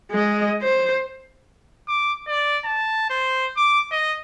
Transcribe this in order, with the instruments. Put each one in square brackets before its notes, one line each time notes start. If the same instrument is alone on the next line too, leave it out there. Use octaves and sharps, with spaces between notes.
[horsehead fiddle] G#3 D#5
C5
[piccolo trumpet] D6
D5
A5
C5
D6
D#5